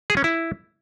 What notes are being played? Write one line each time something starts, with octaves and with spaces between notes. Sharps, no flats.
G#4
C#4
E4